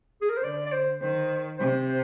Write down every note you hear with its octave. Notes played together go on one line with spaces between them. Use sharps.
G#4
A#4
C5
D3 D5
D5
C5
D#3 C5
C3 C5
C5